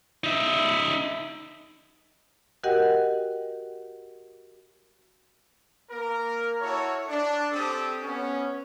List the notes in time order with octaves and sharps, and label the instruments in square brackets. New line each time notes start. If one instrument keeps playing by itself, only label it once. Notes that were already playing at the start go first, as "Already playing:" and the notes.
[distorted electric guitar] D#4 E5
[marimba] F#4 G4 A#4 D#5 F#5 G5
[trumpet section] A#3 A#4
E4 F#4 A4 C#5
D4
C4 D4 G4 A4 D#6
B3 C#4